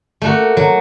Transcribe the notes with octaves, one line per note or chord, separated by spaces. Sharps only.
A3 A#3 F#4
F#3